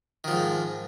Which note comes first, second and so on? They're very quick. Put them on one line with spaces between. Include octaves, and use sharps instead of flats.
D#3 F3 G#2